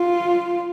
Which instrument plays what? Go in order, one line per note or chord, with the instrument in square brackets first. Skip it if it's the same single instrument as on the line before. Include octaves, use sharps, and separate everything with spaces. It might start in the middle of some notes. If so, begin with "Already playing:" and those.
Already playing: [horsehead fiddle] F4